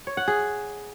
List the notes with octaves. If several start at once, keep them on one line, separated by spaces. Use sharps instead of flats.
C#5
F#5
G#4